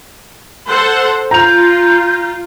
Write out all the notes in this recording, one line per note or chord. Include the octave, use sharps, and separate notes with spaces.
A4 C5 F#5
F4 A#5 G6 F7